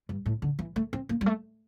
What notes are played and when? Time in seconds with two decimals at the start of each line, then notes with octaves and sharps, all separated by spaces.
0.09 G2
0.26 A2
0.42 D3
0.59 E3
0.76 A3
0.93 C4
1.09 A#3
1.21 G3
1.26 A3